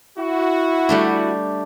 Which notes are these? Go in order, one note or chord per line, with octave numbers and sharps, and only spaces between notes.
E4 F#4
G3 A3 D4